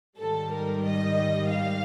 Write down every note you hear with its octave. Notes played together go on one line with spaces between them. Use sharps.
G#2 D#3 G3 A4
A#4
D#5
F5